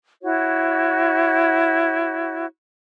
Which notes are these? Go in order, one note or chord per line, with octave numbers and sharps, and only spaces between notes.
E4 F#4 C#5